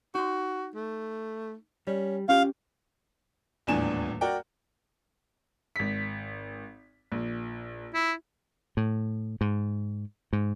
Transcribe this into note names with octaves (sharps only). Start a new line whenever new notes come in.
D#4 F#4 C6
A3
G3 C#4
C#4 F4 G4 F5
D#1 E2 A2 D4 G#5 E7
F#4 A#4 D5 G5
G#1 B6
A#1
E4
A2
G#2
G#2